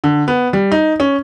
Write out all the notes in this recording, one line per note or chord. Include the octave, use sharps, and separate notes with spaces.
D3
B3
G3
D#4
C#4